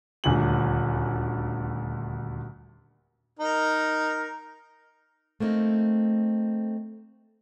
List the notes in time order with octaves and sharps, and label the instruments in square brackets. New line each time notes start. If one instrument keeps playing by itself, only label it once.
[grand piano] D#1 D2 G#5 F#7
[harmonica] D#4 A#4
[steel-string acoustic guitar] A3 A#3 C4 D#4